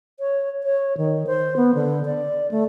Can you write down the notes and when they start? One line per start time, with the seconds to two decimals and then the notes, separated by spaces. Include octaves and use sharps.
0.20 C#5
0.64 C#5
0.97 D#3
1.27 C5
1.57 B3
1.75 D3
2.05 D5
2.51 A3